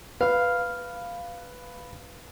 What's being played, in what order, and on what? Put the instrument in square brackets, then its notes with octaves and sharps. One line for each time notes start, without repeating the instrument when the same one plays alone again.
[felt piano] B4 [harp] F5 F6